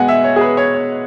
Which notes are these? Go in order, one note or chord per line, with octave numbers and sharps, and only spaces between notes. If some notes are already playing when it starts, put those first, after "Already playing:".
Already playing: B2 G#3 B3 F#5 G#5
E5
C#5
G#4
B4
C#5
C#5